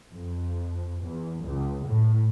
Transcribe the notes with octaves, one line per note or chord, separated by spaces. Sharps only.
F2
E2
C#2
A2